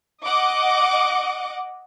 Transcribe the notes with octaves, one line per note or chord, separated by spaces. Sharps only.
D#5 F#5 D6